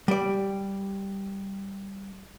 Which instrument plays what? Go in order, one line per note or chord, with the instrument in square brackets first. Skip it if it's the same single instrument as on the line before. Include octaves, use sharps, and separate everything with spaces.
[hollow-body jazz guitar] G3 D5